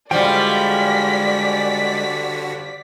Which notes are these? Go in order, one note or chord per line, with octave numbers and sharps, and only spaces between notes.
D3 F3 G3 G#3 F#4 D5 G5 B6